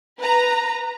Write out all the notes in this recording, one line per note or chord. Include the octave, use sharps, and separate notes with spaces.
B4 A#5